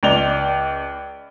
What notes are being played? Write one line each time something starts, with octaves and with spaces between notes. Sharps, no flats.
C#2 D5 F7 G7